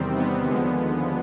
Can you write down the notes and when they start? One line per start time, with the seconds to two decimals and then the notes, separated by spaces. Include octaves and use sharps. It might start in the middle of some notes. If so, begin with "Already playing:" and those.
Already playing: E2 C3 D#3 G3 C4
0.16 B3
0.46 D#2 D3 F3 G#3